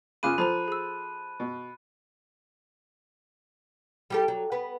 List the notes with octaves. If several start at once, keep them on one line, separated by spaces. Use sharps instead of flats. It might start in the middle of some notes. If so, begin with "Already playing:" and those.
C#3 F4 G#4 B5 D6 F#6 D#7
F3 A4 C5 A#5 B5
G#4 E6
B2
G3 G4 A4
F#3
B3 B4